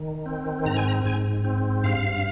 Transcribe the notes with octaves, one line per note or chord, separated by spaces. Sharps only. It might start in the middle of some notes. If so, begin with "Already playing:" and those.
Already playing: D#3
C4
G#2 A#5
G#5
A#5
G#2 G#5
C4
G2 F5